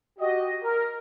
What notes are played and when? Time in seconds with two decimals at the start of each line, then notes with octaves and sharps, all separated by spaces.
0.19 F#4 G4 D#5
0.62 A#4